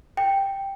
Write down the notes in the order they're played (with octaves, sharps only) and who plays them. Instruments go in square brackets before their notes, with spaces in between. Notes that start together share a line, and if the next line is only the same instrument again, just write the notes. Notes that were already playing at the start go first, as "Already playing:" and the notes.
[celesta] G5